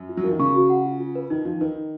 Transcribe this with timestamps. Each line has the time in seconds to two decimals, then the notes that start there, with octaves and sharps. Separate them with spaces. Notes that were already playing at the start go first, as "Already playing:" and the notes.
Already playing: F#2
0.09 F4
0.17 F#3
0.24 F3 A#4
0.31 D#3
0.39 C#3 C#6
0.54 F#4
0.70 F#5
0.85 F4
1.00 F4
1.15 B4
1.30 D#3 D#4
1.45 F3 D#4
1.61 D#3 B4
1.76 D#4